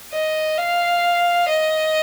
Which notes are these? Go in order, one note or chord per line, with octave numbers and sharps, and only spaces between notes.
D#5
F5
D#5